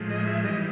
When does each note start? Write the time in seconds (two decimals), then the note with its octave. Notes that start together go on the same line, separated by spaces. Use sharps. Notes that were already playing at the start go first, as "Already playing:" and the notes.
Already playing: A2 F3 G#3
0.10 D#5
0.27 E5
0.44 G#2 E3 G3 D#5